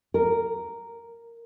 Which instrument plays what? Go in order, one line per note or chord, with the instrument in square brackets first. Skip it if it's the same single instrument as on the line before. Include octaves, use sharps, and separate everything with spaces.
[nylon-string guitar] A#4